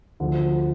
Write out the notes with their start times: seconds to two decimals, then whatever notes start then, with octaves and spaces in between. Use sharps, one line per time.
0.20 D2 D3 F3